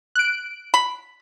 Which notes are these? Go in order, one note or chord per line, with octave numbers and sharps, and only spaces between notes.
F#6 D7
B5